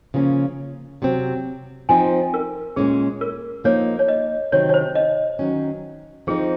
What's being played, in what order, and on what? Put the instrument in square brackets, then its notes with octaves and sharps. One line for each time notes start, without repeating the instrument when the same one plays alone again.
[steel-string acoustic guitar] C#3 F3 A#3 C#4
C3 F#3 C4
[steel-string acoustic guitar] F3 C4 D#4 [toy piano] G#5
[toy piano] A#4
[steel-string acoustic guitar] A#2 G#3 C#4 [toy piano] G#4
[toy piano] A#4
[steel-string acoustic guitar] F3 A#3 D#4 [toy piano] C#5
[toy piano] C#5
D#5
[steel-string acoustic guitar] C3 D#3 F#3 C4 [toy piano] C#5
[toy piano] C#5
C5
D#5
[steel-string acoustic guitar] D#3 F#3 C#4
[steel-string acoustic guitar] F3 C4 D#4 [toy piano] G#4